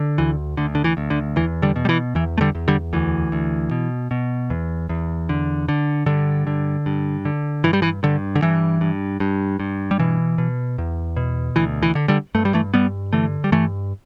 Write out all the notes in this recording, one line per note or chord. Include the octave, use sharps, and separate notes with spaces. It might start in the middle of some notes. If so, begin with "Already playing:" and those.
Already playing: D3
D2 E3
D2 D3
D3
E3
D2
D3
E2 E3
D3 G3
B2
G3
E3
E2 E3
A3
D3 G3
E2
D3 G3
D2 E3
D2
B2
B2
E2
E2
D3
D3
G2 D3
D3
G2
D3
G2 E3
G3
E3
G2 D3
D3
G2 E3
G2
G2
G2
G3
B2 E3
B2
E2
B2
D2 E3
E3
D3
D3 G3
G2 A3
G3
E3 A3
G2 G3 B3
D3 E3 A3
G3
G2 E3 A3